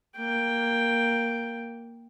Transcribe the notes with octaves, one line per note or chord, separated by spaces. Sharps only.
A#3 G5